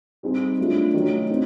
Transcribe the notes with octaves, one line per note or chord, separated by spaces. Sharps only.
G3 C4 D#4 G#4
F#3 A3 D4 F4
D#3 F#3 A3 C#4
C4 D#4